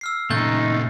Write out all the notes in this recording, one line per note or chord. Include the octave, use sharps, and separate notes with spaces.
E6 F6 C7
A#2 C#3 A3 D#4 F#6 G6 A6